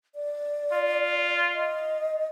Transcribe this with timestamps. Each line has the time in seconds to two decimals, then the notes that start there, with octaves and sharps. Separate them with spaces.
0.15 D5
0.73 F4
1.54 D#5